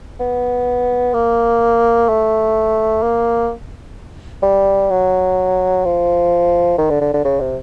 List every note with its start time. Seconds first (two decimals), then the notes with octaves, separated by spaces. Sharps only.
0.20 B3
1.13 A#3
2.08 A3
3.02 A#3
4.42 G3
4.90 F#3
5.84 F3
6.78 D#3
6.90 D3
7.01 D3
7.14 D3
7.25 C#3
7.40 C3